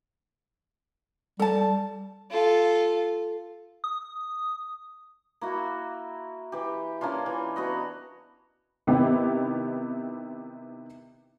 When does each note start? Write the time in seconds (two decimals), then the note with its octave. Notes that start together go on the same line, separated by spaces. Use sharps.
1.39 G3 A4 A5
2.31 F4 A4
3.84 D#6
5.41 A#3 E4 F#4
6.52 E3 G4
7.01 A#3 C#4 D4 F4
7.26 E3
7.56 B3 F#4 D#5
8.87 C3 D#3 B3 E4 G4